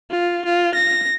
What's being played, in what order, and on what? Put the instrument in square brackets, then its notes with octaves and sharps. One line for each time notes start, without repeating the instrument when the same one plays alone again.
[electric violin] F4
F4
A#6